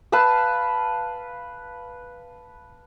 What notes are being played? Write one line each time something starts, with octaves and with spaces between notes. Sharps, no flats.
B4 F5 A5 E6